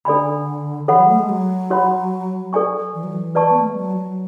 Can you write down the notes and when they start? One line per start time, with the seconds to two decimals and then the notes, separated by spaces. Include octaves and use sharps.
0.05 D3 D4 A4 D5 G#5 B5
0.88 E3 A4 C#5 F#5 B5
0.99 F#3
1.09 A3
1.19 G#3
1.29 F#3
1.70 F#4 C#5 F#5 B5
2.53 A4 D5 G#5 C#6
2.94 E3
3.04 F#3
3.13 E3
3.35 B4 D5 A5 C#6
3.51 B3
3.59 A3
3.68 G#3
3.76 F#3
3.96 F#3